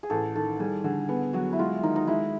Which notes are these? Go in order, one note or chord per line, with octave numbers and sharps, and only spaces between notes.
G#4
A1 A4
D#3 A4
G3 G#4
D3 G#4
B3 G#4
F#3 F#4
E4
G#3 F4
D#3 D#4
D#4
G#3 E4